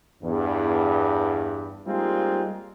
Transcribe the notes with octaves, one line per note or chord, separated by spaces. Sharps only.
E2 G2
G3 G#3 A#3 C4 D#4 F4